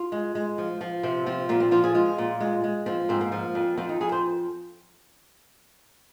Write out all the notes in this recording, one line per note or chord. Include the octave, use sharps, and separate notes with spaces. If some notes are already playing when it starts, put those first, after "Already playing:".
Already playing: F4
G#3
G#3
F3
F3
C3 C4
F3 C4
A#2 A#3
C4
F3 F4
G#4
G#3 F4
A#2
G#3
G#3
F3 C4
G#2 C4
A#3
F3
F2
F2 C4
D#4
F2 G#4
C5